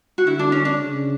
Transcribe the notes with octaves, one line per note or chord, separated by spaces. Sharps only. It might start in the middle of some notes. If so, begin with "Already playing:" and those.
F#4
D3 E4
D4
C#4
D4
C#3